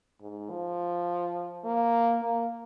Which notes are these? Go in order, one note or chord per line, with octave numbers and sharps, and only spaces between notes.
G#2
F3
A#3
A#3